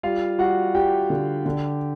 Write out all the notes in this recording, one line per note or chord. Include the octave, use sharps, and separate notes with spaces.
G3 F4 F5
G3 F#4 F#5
G3 G4 G5
D3
D3